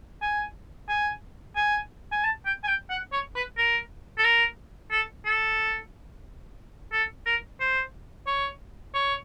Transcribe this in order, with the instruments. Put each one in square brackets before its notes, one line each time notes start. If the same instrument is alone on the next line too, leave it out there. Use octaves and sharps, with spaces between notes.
[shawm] G#5
G#5
G#5
G#5
A5
G5
G#5
G5
F#5
C#5
B4
A#4
A4
A#4
A4
A4
A4
A#4
C5
C#5
C#5